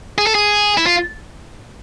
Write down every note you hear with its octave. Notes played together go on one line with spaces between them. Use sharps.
G#4
A4
G#4
E4
F4